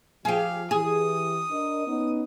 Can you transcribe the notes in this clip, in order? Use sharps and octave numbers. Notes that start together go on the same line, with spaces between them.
F3 G4 G#4 F5
E3 G4 G#4 D#6
D4 A#4 D#5
B3 C#4 D#4